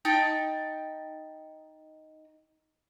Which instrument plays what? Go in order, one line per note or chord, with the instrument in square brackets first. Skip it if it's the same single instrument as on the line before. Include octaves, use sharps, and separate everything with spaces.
[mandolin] D#4 G5 A5